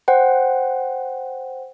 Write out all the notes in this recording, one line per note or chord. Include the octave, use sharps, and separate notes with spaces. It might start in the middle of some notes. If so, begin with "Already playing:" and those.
C5 F#5 G5